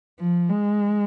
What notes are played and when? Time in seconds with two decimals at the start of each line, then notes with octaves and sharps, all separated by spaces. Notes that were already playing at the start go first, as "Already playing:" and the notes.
0.20 F3
0.49 G#3